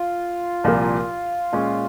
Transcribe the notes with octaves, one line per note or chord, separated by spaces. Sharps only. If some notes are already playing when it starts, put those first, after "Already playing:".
Already playing: F4
C2 A#2 F3 A#3
A#2 G#3 C#4